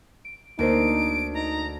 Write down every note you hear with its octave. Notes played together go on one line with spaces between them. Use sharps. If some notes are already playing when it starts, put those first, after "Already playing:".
D7
D2 A#3 D#4 A#4 C5 D7
D#4 A#5